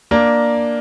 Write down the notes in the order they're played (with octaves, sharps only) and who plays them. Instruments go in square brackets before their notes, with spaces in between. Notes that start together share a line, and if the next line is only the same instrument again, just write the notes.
[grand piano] A#3 D4